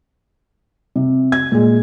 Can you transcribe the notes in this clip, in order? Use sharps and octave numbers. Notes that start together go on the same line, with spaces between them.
C3
G#6
A#2 G#3